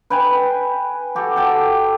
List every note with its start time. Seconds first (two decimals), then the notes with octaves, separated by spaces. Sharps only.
0.10 B4 G5 G#5 B5
1.15 F#4 G4 A4
1.36 A4 G5 A5